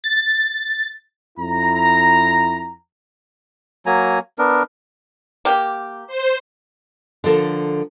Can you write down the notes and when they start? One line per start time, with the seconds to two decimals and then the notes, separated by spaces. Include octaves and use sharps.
0.04 A6
1.39 F2 E4 A#5
3.86 F#3 A#3 G#5 A#5
4.38 B3 D4 A#4
5.45 A#3 G4
6.07 C5
7.24 D3 F3 A4 A#4